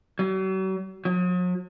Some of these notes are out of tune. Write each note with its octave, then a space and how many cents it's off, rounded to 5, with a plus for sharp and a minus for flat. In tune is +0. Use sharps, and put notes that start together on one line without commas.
F#3 +45
F#3 -45